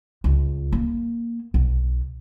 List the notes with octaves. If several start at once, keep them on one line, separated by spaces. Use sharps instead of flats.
C#2
A#3
B1